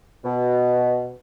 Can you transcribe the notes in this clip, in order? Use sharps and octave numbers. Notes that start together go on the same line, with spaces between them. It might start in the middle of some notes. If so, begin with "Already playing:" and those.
B2